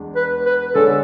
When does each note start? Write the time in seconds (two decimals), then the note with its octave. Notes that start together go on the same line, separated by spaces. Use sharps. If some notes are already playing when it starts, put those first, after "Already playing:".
Already playing: E2 G#3 D4
0.16 B4
0.46 B4
0.75 D3 G#3 D4 G#4 A4 C#5